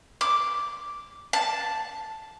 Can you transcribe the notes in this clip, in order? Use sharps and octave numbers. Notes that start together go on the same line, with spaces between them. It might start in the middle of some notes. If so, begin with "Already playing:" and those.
D6
A5